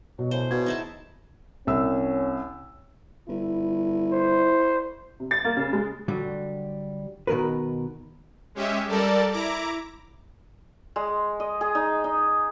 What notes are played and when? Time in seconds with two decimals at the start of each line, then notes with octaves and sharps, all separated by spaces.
0.19 B2 F#3
0.31 A2 C#3 C5
0.51 B2 G#6
0.66 D#4 E4 A5
1.67 C2 C#4 E6
3.28 G1 E4
4.12 C5
5.20 C3
5.31 A6
5.45 A#3
5.57 C#3
5.73 G#3
6.08 D3 F#3 G3
7.27 B2 D#3 G#3 A#4 B4
8.55 G#3 C#4 G4 E5
8.87 G3 A4 A#4 D5 A5
9.31 E4 A#5 D6
10.96 G#3
11.40 D#5
11.61 G#4
11.75 D#4
12.04 D#4